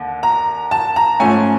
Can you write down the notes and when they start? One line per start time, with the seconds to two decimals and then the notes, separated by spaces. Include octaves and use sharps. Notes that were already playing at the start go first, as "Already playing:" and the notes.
Already playing: D#2 D3
0.23 A#5
0.71 A5
0.96 A#5
1.20 G#2 F3 A3 C#4 G#5